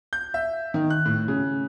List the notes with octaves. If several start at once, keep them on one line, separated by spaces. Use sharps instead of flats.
G6
E5
D#3
F#6
A2
C#3